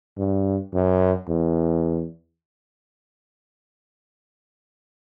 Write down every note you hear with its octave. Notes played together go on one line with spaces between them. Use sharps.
G2
F#2
E2